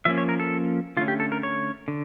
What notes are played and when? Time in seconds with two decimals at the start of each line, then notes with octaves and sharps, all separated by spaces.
0.05 F3 A#3 C#4 E5
0.18 C#5
0.29 A#4
0.40 A4
0.97 D3 A3 C#4 F4
1.08 G4
1.20 A4
1.32 A#4
1.43 C#5
1.88 D3